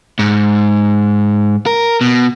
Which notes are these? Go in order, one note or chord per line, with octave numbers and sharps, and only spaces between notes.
G#2
A#4
B2